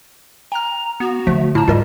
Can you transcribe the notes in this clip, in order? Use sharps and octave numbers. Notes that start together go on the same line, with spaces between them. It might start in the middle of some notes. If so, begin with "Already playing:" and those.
G5 A#5 F6
B3 F#4
D3 F3 A3
A2 E4 A5 A#5
G#2 G3 F4 A#4 D#5